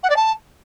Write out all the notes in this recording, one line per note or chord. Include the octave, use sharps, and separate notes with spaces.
F#5
D5
A5